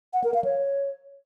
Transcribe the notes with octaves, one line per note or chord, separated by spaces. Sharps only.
F#5
A#4
F5
C#5